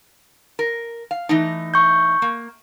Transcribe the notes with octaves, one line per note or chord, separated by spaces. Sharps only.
A#4
F5
E3 A3 D#4
C#6 G6
A#3